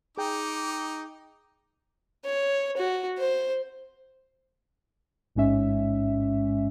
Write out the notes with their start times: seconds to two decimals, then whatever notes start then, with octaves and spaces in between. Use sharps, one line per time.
0.17 D#4 G#4 G5 D6
2.24 C#5
2.77 F#4
3.18 C5
5.35 A1 G#2 G#3 C#4 E5